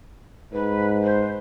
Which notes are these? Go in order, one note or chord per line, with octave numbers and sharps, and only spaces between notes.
G#2 B4
C5